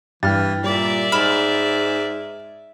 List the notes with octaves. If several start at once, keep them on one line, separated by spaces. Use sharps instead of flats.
G2 E3 G5 F6 A6
A#2 G3 D5 E5
G#2 B5 F6 E7